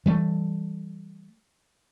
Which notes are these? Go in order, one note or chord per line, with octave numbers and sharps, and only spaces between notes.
E3 G3 A3